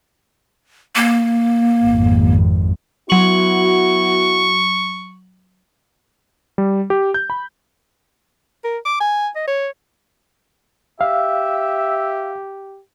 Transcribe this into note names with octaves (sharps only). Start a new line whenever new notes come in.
A#3
G#1 F2
F#3 B3 E4 F#4 C#6 F#7
G3
G4
G6
B5
A#4
D6
G#5
D#5
C#5
G4 E5 F5